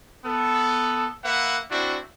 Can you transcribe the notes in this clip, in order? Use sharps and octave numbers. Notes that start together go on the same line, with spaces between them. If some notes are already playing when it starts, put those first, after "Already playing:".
B3 A4
A#3 B4 E5 F#5
C4 D4 E4 F#4